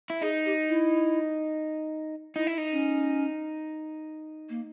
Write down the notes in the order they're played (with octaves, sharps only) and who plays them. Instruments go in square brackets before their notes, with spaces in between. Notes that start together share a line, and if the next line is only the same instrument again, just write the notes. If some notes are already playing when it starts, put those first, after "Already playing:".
[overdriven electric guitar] E4
[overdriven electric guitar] D#4 [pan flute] G#4
[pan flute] G4
E4
[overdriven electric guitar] D#4 [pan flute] E4
[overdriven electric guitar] E4
D#4
[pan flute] C#4
A#3